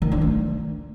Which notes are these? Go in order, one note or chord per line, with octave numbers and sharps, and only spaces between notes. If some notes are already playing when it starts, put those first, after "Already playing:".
D#3
D4
A3